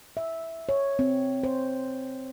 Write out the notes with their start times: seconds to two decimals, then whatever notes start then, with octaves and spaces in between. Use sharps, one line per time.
0.17 E5
0.69 C#5
0.99 C4
1.44 C5